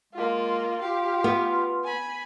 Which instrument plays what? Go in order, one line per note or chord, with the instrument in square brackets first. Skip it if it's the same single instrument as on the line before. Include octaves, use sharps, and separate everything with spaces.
[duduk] G#3 [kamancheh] A#3 F4
[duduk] F4 [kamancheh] G4 F5
[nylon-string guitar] B3
[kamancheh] G#5 B5